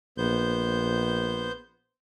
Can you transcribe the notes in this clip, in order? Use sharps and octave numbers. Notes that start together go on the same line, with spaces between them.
A#1 B3 C5 G6